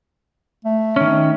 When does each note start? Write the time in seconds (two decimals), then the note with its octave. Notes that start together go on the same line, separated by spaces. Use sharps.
0.65 A3
0.96 D#3 C#4